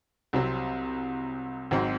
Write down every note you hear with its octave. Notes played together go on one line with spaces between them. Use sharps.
C2 C3 F#3 C4
G#1 G#2 F#3 C4